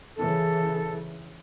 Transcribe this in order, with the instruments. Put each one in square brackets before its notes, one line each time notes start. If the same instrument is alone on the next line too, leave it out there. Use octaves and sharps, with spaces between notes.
[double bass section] C#3 E3 [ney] A4